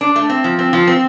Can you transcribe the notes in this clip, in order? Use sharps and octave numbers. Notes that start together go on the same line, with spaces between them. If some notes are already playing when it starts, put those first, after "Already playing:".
D4
A3
C4
F3
C4
F3
C4